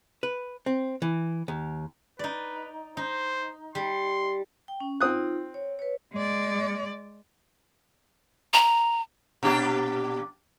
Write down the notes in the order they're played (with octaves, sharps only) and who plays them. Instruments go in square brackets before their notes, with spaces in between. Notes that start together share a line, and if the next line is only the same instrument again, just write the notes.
[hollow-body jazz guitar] B4
C4
E3
D#2
[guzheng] D#4 D5 [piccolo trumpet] B4
[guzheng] D#4 [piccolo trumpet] C5
[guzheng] G3 [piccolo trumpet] C6
[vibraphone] G5
C#4
[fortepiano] C4 D#6 F#6 [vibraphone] D#4 F4
[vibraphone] C#5
B4 C#5
[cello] G#3 D5
[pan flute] A#5
[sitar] A#2 D4 G4